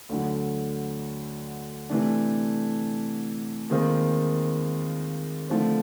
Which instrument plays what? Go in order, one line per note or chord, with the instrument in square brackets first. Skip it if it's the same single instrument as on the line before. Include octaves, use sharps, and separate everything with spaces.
[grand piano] D2 D3 F#3
C3 E3 A3 D4
D#2 D#3 G#3 C4 F4
D3 F3 A3 C4